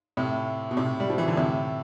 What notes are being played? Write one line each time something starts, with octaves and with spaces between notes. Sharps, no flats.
A2 C3
B2
A2 C3
G3
F3
E3
D3
A2 C3